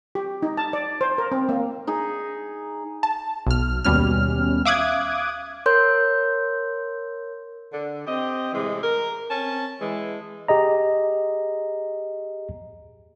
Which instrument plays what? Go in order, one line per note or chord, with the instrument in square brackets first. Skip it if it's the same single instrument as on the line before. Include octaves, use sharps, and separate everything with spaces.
[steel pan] G4
D#4
A5
D5
C5
A#4
C4
A#3
[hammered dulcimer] D#4 G#4
[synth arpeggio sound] A5
B1 F6
D#2 B2 G3 C#4 F6
E5 F5 D6 D#6 F#6 G#6
[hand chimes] A#4 C#5 C6 G6
[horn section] D3
C4 G4 D#5
A2 C3 E3 G#3
A#4
C4 C#4 A5
E3 G#3
[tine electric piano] G4 G#4 D#5 A#5